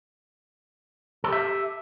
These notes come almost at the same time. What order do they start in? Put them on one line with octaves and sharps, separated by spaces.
A4 G4 E5